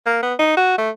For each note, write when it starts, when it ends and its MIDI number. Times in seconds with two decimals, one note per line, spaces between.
0.06 0.21 58
0.23 0.34 59
0.39 0.53 63
0.57 0.78 66
0.78 0.90 57